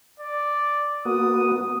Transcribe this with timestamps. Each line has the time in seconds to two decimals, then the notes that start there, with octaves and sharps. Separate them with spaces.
0.20 D5
1.05 A#3 B3 F#4 D#6